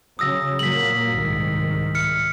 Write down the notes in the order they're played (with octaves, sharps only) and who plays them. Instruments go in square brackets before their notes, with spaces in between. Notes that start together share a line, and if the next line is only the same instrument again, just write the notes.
[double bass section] C#3 F#3 [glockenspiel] D#6 E6 A#6
[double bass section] A#2 F#3 A#3 [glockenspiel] B6 F#7
[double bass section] C2 G#2 D#3
[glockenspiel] F6 C#7